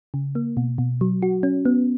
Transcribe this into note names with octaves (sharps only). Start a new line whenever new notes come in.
C#3
A#3
B2
B2
F#3
F#4
C#4
B3